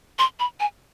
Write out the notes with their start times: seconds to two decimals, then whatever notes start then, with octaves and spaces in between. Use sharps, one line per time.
0.19 C6
0.39 B5
0.60 G#5